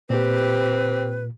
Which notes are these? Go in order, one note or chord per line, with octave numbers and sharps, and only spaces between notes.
A#2 C4 G4 B4